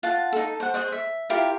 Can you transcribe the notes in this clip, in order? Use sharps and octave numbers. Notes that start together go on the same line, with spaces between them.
F4 F#5 A5
D#4 A4
C5 F#5
G#4 C5 D#5
E5
E4 F4 G4 A#4